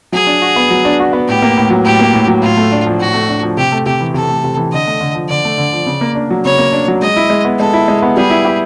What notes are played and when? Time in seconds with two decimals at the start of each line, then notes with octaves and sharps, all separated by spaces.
0.12 F#3 G#4
0.27 D4
0.42 F#4
0.56 B3
0.71 F#3
0.85 D4
1.00 F#4
1.13 B3
1.28 A2 G4
1.42 A#3
1.57 A2
1.70 F#3
1.85 A2 G4
2.00 A#3
2.13 A2
2.28 F#3
2.42 A2 F4
2.57 A3
2.72 D4
2.86 F3
3.00 A2 F#4
3.14 A3
3.29 D4
3.43 F3
3.57 C3 G4
3.72 A3
3.86 C3 G4
4.01 E3
4.14 C3 A4
4.30 A3
4.44 C3
4.57 E3
4.72 D3 D#5
4.87 A3
5.01 D3
5.15 F3
5.29 D3 D5
5.45 A3
5.58 D3
5.73 F3
5.86 C#3
6.01 A#3
6.15 D4
6.31 F#3
6.45 C#3 C#5
6.58 A#3
6.73 D4
6.88 F#3
7.01 G#3 D#5
7.16 E4
7.30 G#3
7.45 B3
7.59 G#3 A4
7.73 E4
7.88 G#3
8.02 B3
8.17 G3 G#4
8.30 E4
8.45 G4